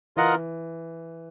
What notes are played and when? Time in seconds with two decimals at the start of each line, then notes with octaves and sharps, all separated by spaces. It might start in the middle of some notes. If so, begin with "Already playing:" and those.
0.16 E3 F4 A#4 D#5 F#5